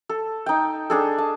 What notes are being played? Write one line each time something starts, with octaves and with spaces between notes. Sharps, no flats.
A4
D#4 G5
D4 G#4 A4
A5